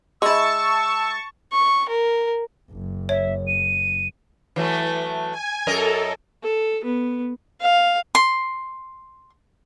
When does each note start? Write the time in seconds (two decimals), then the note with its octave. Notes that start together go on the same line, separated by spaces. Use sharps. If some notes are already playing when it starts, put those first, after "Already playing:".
0.22 G#3 E4 A5 C#6 E6
1.52 C#6
1.89 A#4
2.71 F#1
3.09 C#5 E5
3.47 D#7
4.56 E3 F#3 A3
5.31 G#5
5.67 F#2 A4 A#4 D#5
6.43 A4
6.84 B3
7.62 F5
8.15 C6